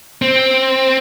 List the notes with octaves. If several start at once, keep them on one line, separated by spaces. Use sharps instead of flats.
C4